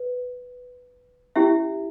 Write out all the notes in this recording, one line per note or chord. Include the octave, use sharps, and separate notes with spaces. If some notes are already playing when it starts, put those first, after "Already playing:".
Already playing: B4
C#4 E4 G4 E5